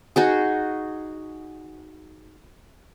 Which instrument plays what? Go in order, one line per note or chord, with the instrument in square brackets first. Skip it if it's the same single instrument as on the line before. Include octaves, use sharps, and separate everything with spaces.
[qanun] D#4 F#4 G#4